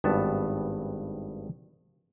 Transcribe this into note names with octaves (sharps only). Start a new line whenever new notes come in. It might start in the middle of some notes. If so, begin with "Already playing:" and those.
G#1 G2 B3 A5